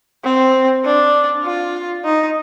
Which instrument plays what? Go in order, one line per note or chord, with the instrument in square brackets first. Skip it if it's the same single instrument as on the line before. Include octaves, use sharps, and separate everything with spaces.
[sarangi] C4
D4
F4
D#4